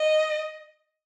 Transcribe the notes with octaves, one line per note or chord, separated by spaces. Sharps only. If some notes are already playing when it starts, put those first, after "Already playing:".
Already playing: D#5